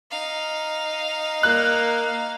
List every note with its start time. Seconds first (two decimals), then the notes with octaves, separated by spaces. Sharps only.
0.11 D#4 F5
1.43 A#3 F#6